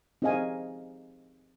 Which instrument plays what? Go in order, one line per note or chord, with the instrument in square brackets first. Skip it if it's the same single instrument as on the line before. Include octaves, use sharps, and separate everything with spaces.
[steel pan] C4 D#4 G#4 D#5 F5 G#5